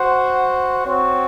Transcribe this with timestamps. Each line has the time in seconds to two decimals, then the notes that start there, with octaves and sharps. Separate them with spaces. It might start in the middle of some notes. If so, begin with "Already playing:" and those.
Already playing: F#4 C5 F#5
0.84 C4 F#4 C#5